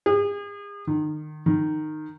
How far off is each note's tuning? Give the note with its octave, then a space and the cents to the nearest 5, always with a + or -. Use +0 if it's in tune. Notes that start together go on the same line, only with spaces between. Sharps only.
G#4 -40
D#3 -30
D#3 -15